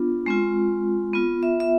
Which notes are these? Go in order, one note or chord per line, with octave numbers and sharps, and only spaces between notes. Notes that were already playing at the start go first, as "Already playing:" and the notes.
Already playing: B3 D4 F4
G#3 C4 F4
B3 F4
E5
E5